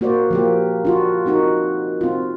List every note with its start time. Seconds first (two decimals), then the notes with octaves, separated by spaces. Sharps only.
0.01 A#3 F#4 C5 D5
0.31 F3 A#3 G4
0.85 D4 F4 F#4
1.26 C4 D#4 F#4 A#4
2.01 C4 F4